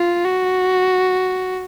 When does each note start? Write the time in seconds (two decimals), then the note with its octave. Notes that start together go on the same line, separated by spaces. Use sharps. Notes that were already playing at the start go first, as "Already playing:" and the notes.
Already playing: F4
0.24 F#4